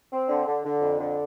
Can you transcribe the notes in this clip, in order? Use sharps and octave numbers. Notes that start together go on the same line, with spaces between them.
C4
D3
D3
D3
F2
D3